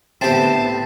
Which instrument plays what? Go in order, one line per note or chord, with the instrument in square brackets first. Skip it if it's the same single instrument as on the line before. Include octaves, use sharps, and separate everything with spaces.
[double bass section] A2 D3 B3 [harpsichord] C4 G4 [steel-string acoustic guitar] C5 E5 [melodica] A5